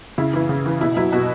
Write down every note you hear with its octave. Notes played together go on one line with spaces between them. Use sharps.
C#3 E4
E3 E4
C#3
E3
B2 E4
F#3 E4
B2 F#4